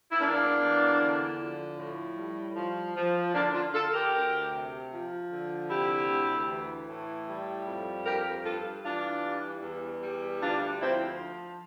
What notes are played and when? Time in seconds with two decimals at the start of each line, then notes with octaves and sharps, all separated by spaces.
0.11 E4
0.20 E2 A#3 D4
0.60 E2
0.99 D3
1.39 F3
1.77 A2
2.17 G3
2.56 F3
2.96 F3
3.34 D3 A#3 D4
3.54 D4 F4
3.74 D3 F4 A4
3.93 G4 A#4
4.14 D2
4.52 C3
4.92 F3
5.31 D3
5.70 C3 E4 G4
6.09 D2
6.49 E3
6.88 A2
7.28 G3
7.67 F2
8.05 G2 G4 A#4
8.45 G2 F4 A4
8.84 E3 D4 F4
9.24 G3
9.62 E2
10.02 G3
10.41 D2 D4 F4
10.80 F3 C4 E4